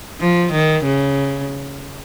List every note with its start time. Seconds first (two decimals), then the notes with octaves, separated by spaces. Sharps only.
0.20 F3
0.52 D#3
0.84 C#3